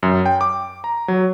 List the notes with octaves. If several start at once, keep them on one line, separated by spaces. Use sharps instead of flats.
F#2
G5
D6
A#5
F#3